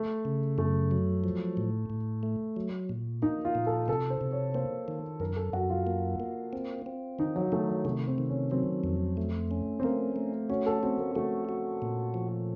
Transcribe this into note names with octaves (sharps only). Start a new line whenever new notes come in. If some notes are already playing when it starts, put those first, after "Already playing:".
Already playing: A3
C#3
F#2 A3
F#3
F3
A2
A2
A3
F#3
A#2
A#3 D#4
F4
A#2
A4
C3 A4
C5
C3
C#5
A#3 C5
D#3
F#2 A#4
A4
F#2 F#4
F4
A#3
A#3
C4
C4
D#3 D#4
F#3
D#3 A3
F#3
C3 A3
C4
D#3
C#4
F#3 C4
F2
A3
C#4
C4
A3 A#3
A3
C#4 F#4
A4
C4 F#4
A#3
A3 F#4
F#4
A#2
F3